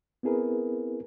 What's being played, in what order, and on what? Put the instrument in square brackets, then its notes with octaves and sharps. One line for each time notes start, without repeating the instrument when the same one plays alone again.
[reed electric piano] B3 C4 E4 G#4 A#4 B4